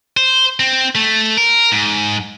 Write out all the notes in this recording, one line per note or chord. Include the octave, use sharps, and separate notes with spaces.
C5
C4
A3
A#4
G#2